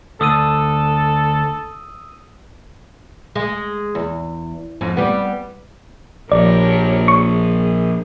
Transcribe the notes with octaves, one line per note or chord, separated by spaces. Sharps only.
D2 D3 A4 D#6 E6 D#7
G#3
E2
F2 G#2 C#4
G3 B3
A#1 G4 A#4 C#5 D5
G#4 C#6